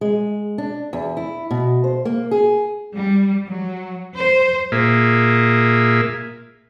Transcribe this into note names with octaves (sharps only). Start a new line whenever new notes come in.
G#3
D4
E2
E4
B2
C5
A#3
G#4
G3
F#3
C5
A#2 A#3 G#4 E5